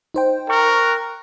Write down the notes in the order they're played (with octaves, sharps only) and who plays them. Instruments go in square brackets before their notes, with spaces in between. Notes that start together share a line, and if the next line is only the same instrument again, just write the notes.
[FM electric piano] D#4 C5 G5
[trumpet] A#4 [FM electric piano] G5 C#6 F#6